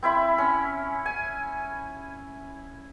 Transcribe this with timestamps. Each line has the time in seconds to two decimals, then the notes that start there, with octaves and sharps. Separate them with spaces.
0.03 C4 E4 E5 B5
0.38 C#4
1.06 G#5